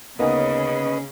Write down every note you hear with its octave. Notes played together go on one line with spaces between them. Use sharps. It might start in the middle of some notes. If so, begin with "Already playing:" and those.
D2 C#3 A#3 B3 C#4 D#4 B4 D#5